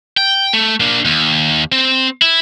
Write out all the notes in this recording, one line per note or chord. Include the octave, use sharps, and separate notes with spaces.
G5
A3
A#3 D4
D#2
C4
E4